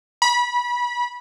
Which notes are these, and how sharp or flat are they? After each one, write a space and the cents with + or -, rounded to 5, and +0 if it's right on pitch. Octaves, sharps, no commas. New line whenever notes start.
B5 -25